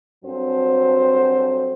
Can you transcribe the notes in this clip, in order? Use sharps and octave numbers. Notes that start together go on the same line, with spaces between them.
G2 F#3 C4 F#4 A4 C5